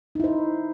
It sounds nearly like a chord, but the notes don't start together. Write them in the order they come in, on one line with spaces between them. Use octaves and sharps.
D#4 E4 C5